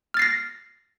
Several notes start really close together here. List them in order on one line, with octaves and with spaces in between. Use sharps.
F6 A6 C7 A#6